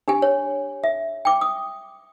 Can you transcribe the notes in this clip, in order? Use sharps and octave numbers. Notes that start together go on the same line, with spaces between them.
D4 G4 G#5
C#5
E5
G5 D6
D#6